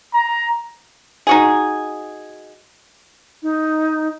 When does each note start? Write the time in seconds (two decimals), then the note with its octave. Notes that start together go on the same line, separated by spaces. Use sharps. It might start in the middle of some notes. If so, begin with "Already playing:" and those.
0.14 A#5
1.27 D#4 F#4 G#4
3.42 D#4